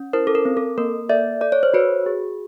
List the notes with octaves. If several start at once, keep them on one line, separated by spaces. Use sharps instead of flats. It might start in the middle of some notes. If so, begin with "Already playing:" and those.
Already playing: C#4
E4 A#4 C5
A4
A#4
C4
A4
A#3 A#4
A4 D5 E5
A4 D5
C#5
C5
F#4 B4 C#5
G#4